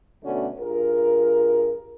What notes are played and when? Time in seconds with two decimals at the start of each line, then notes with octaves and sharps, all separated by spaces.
0.23 D2 B2 A3 C#4 F#4 D5
0.59 G2 F4 G#4 A#4